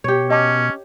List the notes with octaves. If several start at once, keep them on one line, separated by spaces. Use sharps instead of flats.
B2 G4 C#5
C#4 D#5 A5 D6